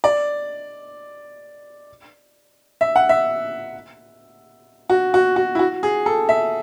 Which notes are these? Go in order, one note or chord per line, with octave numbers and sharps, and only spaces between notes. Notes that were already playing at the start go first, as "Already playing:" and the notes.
D5
E5
F#5
E5
F#4
F#4
F#4
E4
F#4
G#4
A4
E5